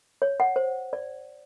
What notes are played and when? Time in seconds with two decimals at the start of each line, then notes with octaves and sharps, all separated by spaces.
0.22 C#5
0.40 F#5
0.56 C5
0.93 D5